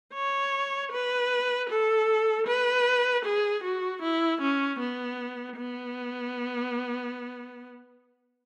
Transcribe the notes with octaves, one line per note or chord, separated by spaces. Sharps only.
C#5
B4
A4
B4
G#4
F#4
E4
C#4
B3
B3